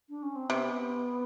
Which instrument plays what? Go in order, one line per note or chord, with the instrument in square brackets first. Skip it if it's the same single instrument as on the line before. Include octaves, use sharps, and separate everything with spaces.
[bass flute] D4
C#4
C4
[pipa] C3 [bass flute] B3